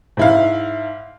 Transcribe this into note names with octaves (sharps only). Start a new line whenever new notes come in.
G#2 E4 F5